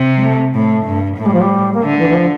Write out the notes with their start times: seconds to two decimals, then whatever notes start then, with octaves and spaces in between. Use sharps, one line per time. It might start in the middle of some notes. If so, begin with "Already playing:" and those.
Already playing: C3
0.16 G3
0.22 A3
0.54 A2 A3
0.86 G2
1.17 A2 A3
1.25 G3
1.33 F3
1.40 G3
1.73 A#3
1.82 D3 A3
1.98 E3
2.08 E3
2.14 F3